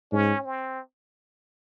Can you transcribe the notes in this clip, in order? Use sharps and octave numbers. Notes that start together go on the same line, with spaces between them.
G#2 C#4
C4